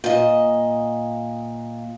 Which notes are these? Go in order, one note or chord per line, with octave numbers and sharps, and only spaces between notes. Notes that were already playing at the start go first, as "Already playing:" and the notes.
A#2 D#5